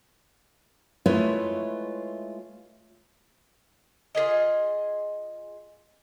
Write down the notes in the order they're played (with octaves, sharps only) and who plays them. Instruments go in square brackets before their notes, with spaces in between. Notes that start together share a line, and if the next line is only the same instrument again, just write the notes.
[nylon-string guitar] G#3 A3 E4 F4 B4 C#5
[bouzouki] F4 G4 G#4 D#5